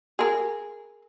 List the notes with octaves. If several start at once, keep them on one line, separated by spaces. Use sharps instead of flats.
G#4 A#4